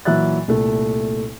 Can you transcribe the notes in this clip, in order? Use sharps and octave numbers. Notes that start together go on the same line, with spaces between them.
A#2 E3 F#3 E5 F#6 A6
C2 A#2 A3